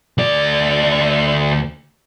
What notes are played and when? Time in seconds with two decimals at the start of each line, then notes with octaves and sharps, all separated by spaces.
0.18 D2 D5